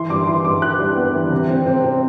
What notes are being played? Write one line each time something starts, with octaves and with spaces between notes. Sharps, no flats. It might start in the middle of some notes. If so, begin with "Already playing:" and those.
Already playing: E3 C6
G2 D6
E4 C6
G2 D6
E4 F#6
G2
B3
E3
C3
C4
C4
C4